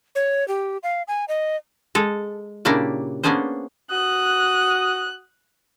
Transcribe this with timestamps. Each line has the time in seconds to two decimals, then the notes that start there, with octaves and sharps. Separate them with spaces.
0.15 C#5
0.48 G4
0.83 F5
1.08 G#5
1.28 D#5
1.95 G#3 A4
2.65 A#2 C#3 A#3 D4 E4 G4
3.23 A#3 B3 C#4 D4 G#4 C5
3.91 F#4 D#6 F#6